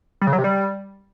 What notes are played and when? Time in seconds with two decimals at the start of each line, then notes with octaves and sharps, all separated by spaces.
0.21 G3
0.27 C#3
0.33 F#3
0.38 C3
0.44 G3